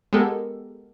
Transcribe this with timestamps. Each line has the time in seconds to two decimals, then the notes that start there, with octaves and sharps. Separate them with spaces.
0.13 G#3 B3 G4 A4 A#4